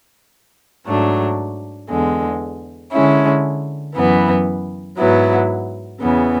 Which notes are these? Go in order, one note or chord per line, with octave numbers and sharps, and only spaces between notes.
G#2 F#3 A3 D4
E2 D3 G#3
D3 G#3 C#4 E4
F#2 E3 B3
G#2 F#3 B3 E4
E2 C#3 E3 B3